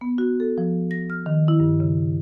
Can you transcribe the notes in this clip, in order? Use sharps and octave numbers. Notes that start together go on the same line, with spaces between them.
B3
F#4
A4
F3
A#6
F6
D#3
E4
G2
C#3